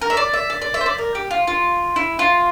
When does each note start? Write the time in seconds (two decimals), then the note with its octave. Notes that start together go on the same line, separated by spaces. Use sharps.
0.01 A#4
0.10 E5
0.17 D5
0.33 E5
0.50 D5
0.62 D5
0.74 E5
0.81 C5
0.86 D5
0.98 A#4
1.15 G4
1.31 F4
1.47 F4
1.96 E4
2.19 F4